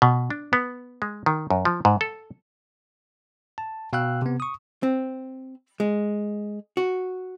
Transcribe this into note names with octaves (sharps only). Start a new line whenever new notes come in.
B2
D4
B3
G#3
D#3
F#2
F3
G#2
A4
A5
B2 F5 G5 E6 F#6
C3 B3
C#6 D#6
C4
G#3
F#4